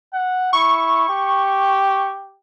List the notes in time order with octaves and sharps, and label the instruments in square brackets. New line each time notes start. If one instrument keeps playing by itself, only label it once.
[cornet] F#5
[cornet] E4 [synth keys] C#6
[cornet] G4